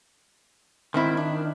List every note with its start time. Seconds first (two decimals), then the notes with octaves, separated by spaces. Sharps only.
0.94 G#2 D#3 C4 E4
1.17 D4